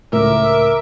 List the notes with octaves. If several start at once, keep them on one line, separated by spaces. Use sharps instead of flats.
C#2 A2 A#4 E5 D6